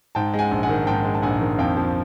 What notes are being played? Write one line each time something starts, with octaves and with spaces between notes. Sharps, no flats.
G#2 G5 A5
G#3
F#5 G#5
A#1
F#5 G#5
D#3
G#2 G5 A5
G#3
A5
A#1 F#5 G#5
D#3
F2 F5 G5
F3